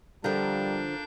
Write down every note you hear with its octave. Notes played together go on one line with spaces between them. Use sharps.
D3 F3 G3 D4 F4 A4 A#4 G6